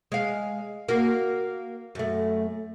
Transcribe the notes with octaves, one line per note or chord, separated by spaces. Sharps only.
G#3 F5
A#3 F#4
F#2 A3